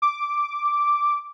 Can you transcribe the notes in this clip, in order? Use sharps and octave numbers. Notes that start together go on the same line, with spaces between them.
D6